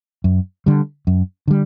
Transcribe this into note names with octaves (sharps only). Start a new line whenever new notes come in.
F#2
D3 G3
F#2
D3 G3